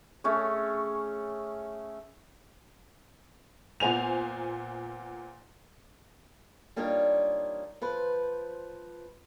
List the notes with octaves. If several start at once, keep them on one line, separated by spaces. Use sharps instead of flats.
A3 C#4 G#4 C#5
A#2 B3 C5 G#5 F7
G3 A#3 D4 D#4 F4 C#5
F3 B4 C5